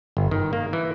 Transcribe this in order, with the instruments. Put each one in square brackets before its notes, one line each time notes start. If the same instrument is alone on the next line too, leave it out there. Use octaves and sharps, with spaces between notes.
[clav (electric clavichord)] G1
D#3
A#3
E3